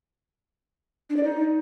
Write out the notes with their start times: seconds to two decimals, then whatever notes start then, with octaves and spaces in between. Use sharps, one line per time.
1.10 D4
1.17 D5
1.23 D#4